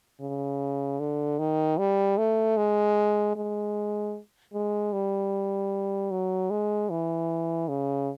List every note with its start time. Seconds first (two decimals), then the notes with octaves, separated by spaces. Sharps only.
0.21 C#3
1.00 D3
1.39 D#3
1.78 G3
2.18 A3
2.57 G#3
3.36 G#3
4.54 G#3
4.93 G3
6.11 F#3
6.50 G#3
6.90 E3
7.68 C#3